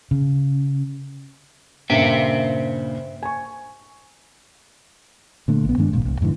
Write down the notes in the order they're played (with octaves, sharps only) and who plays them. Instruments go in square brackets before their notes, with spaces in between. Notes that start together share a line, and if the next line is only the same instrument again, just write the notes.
[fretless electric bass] C#3
[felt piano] G2 A#2 C#3 [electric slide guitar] C5 E5 G5
[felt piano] G#5 C#6
[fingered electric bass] A#2 D3 A3
A#1 B3
G2 D#3 G#3 D4
D1 G1 C2 A#2
C2
F2 G#2 D3 E3